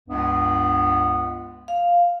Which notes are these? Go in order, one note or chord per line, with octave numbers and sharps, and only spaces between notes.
C#2 G2 B3
F5